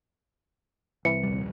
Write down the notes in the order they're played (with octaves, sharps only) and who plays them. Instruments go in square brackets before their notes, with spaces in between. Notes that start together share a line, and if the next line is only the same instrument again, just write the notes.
[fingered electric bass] C2 [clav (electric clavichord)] E3 [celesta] C#7
[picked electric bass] A#1 D#2 G3